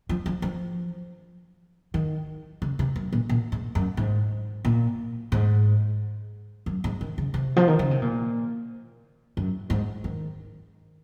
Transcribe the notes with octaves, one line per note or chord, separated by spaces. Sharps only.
F3
F3
F3
D#3
C#3
C3
F#2
A#2
A#2
G#2
F#2
G#2
A#2
G#2
F#2
G#2
D#3
C#3
C3
F3
D#3
C#3
C3
A#2
F#2
G#2
D#3